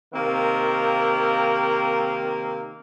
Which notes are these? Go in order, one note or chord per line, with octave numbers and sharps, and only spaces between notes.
C3 D#3 A#3 C4 A#4 F5